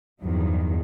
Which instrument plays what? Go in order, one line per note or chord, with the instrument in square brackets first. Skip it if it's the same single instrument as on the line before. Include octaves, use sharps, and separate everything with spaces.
[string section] E2 G2 D#3 F3 F#3